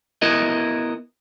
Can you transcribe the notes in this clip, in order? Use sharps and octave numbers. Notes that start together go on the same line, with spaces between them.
B3 E4 A#4 D#5